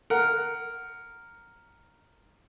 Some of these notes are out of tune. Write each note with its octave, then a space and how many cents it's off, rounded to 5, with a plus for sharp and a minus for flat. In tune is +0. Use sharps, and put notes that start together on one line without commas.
A#4 +0 F#5 +15